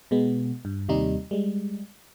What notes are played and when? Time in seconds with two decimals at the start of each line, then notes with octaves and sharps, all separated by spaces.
0.11 B2 G#3 B3
0.65 G2
0.89 D#2 C3 G3 D#4
1.31 G3 G#3